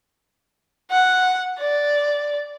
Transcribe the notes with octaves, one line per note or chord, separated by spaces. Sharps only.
F#5
D5